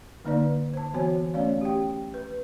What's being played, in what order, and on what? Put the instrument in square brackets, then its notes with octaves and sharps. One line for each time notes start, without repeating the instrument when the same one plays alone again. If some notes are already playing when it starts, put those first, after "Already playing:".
[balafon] D3 A#3 D#4 B4 D5
C5 A5
E3 B3 F#4 C#5 G#5
A3 C#4 C#5 D5 F5
G4 G5
B4